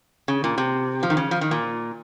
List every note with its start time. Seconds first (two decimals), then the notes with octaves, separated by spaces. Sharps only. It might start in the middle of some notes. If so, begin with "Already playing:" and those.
0.28 C#3
0.44 A#2
0.58 C3
1.03 F3
1.10 D#3
1.17 C#3
1.31 F3
1.41 D#3
1.51 A#2